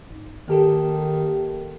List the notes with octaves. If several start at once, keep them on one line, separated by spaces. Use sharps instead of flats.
G#1
D#3 A#3 G4 A4